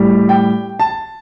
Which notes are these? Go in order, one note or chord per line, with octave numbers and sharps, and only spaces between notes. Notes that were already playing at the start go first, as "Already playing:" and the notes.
Already playing: A2 G3
G5
A5